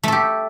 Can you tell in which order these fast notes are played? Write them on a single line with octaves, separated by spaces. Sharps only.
A3 A4 G4